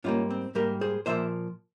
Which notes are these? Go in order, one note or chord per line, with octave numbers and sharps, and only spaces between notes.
G#2 G3 A#3 C#4 F4
C4
G#2 G3 A#3 G4 A#4
G#4 C5
A#2 F3 A#3 C5 E5